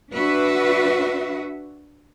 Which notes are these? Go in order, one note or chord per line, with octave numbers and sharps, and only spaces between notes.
D4 F#4 B4 E5